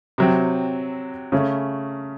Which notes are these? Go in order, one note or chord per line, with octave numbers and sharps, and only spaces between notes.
C3 F#3 C4
C#3 A3 C#4